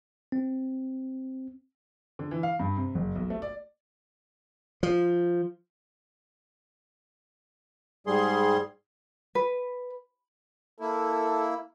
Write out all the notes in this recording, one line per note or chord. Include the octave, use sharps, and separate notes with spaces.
C4
D3
E3
F5
G2
C3
F#1
B1
A3
D5
F3
G#2 G3 G#4 C6
B4
A#3 E4 A4